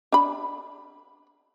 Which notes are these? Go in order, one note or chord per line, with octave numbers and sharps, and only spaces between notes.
D4 B5